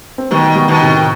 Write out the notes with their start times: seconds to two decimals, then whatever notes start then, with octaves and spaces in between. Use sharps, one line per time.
0.18 C4
0.31 B2 D#3 G3 B3
0.55 G3 B3
0.68 B2 D#3
0.80 A2 C3